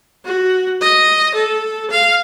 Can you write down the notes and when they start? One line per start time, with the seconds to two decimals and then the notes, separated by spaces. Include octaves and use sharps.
0.25 F#4
0.81 D#5
1.34 A4
1.90 F5